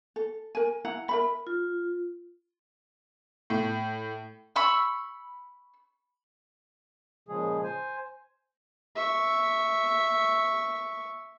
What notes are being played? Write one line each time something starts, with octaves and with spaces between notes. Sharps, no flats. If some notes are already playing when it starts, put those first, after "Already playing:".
A4
A#4 G#5
E4 F#5 A#5
A#4 E5 B5
F4
A2
B5 C#6 E6
A#2 C#3 F3 G#3 G#4
C5 G#5
E5 C#6